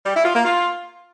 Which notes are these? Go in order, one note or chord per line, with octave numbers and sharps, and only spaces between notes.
G3
E4
F4
A#3
F4